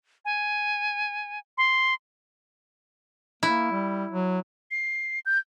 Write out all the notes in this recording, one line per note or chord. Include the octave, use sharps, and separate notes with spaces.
G#5
C6
A#3 E4
G3
F#3
C7
G6